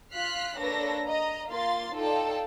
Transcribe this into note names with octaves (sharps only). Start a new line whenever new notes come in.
F4 F6 F#6 B6 C7
A#3 D4 A4 B4 C#5 A#6
D#5 A#5
A#3 F4 F5 C6 A6
D#4 F4 A4 D5 G5 A5